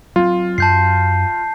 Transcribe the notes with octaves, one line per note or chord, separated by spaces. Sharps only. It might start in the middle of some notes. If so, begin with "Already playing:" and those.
F#3 C4 F4
F#2 A5 G6 C7